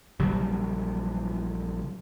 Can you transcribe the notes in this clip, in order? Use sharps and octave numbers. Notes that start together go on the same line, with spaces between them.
A#1 C#3 F#3 G3